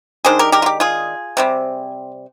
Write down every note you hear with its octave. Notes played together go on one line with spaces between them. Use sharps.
D#3 G#3 D4 G#4 C5
G4 A#4
G4 A#4
F4
G4
F4 G#4
C3 G3 C4